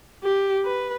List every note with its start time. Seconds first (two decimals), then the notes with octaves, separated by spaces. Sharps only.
0.23 G4
0.65 B4